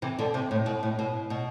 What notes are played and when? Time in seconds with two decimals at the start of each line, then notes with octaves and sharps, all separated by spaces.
0.02 C3 E3
0.19 B2 D3
0.34 C3
0.51 A2
0.66 B2
0.83 A2
0.99 B2
1.30 B2